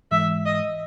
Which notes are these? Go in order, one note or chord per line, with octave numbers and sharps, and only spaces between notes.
G#2 E3 G#3 E5
D#5